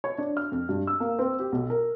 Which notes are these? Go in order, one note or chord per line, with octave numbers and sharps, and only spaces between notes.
C#5
D4
F6
F2
G2
E6
A#3
C4
G4
B1
A#4